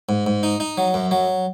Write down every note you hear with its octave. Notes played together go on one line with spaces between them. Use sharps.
G#2
G#2
D#4
D#4
F#3
F#2
F#3